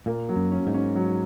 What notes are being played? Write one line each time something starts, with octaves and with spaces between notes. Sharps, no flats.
A#2 A#3
F#3
F#2
C#4
G#2
C#4
F#3